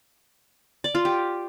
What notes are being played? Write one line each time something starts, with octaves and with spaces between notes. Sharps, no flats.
D5
F4
G4